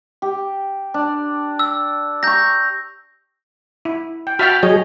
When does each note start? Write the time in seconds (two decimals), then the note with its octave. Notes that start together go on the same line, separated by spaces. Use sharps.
0.22 G4
0.94 D4
1.59 E6
2.23 A#5 C#6 G6 A#6
3.85 E4
4.27 G5
4.39 F#4 E5 G5 A5 B5 F6
4.63 F#3 G#4 C#5 D#5